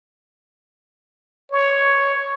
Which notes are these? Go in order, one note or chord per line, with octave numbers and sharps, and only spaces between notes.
C#5